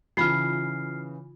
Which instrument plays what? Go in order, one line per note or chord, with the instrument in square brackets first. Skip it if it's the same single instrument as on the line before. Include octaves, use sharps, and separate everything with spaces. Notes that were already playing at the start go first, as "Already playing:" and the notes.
[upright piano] C#3 E3 [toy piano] D#4 F4 F5 [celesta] F6 C7